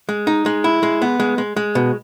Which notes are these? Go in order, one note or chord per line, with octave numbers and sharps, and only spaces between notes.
G#3
D#4
G#3
E4
G#3
B3
G#3
G#3
G#3
B2